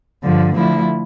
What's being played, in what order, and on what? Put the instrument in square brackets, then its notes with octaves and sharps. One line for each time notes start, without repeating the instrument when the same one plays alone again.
[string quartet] G2 D3 F3
D3 F3 A3 E4